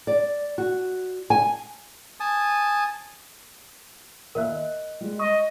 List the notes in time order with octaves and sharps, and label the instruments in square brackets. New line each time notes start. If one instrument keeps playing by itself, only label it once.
[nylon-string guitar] D5
F#4
G#5
[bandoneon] G#5 A5 D#6
[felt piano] D#2 E5 F#6 [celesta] A#4
[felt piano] D#5
G3 G#3
[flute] D#5 [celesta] C#6 [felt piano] D#6